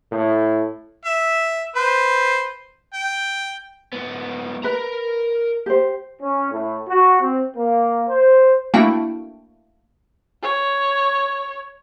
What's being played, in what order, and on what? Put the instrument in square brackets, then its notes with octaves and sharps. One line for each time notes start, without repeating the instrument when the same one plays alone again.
[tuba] A2
[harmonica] E5
B4 C5
G5
[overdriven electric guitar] G#2 B3
[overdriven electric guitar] A#4 A#5 [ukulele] B4
[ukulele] G4 C5
[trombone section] C#4
A2
F#4
C4
A#3
C5
[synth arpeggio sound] A3 A#3 D4 E4 F#4 G5
[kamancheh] C#5